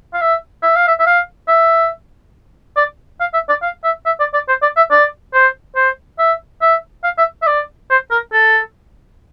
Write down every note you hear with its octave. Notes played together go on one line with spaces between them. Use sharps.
F5
E5
E5
F5
E5
E5
F5
E5
D5
F5
E5
D5
F5
E5
E5
D5
D5
C5
D5
E5
D5
C5
C5
E5
E5
F5
E5
E5
D5
C5
A#4
A4